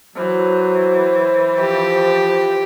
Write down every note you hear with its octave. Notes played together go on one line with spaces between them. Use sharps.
E3 F#3 C5
F3 G4